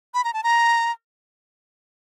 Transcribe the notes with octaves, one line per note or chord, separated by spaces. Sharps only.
B5
A#5
A5
A#5